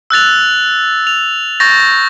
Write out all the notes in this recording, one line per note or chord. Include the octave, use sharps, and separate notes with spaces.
E6 F#6 A6 F7
F7
C#6 G6 A6 A#6